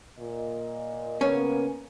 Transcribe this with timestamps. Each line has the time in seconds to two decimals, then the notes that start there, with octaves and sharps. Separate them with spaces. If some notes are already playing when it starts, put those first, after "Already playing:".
0.18 A#2 D#5
1.21 C#3 A#3 B3 C#4